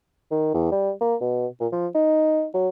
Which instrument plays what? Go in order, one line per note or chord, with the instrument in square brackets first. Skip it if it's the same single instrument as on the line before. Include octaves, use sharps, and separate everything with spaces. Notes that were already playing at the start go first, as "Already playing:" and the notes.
[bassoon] D#3
E2
G3
A#3
B2
A#2
F3
D#4
F#3